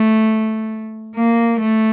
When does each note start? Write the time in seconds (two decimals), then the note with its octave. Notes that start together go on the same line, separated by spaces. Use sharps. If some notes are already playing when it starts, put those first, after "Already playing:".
Already playing: A3
1.16 A#3
1.60 A3